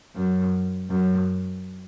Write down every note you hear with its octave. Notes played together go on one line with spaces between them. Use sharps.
F#2
F#2